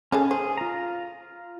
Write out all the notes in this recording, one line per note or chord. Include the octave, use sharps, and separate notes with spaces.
D#3 C#4 G#4 A4
G#4 C5
F4 A#5